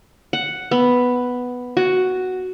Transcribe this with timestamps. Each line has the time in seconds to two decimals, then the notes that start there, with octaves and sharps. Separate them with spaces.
0.33 F#5
0.71 B3
1.77 F#4